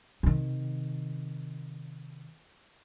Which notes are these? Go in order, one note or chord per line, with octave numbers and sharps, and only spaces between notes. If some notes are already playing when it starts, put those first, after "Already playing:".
C3 D#3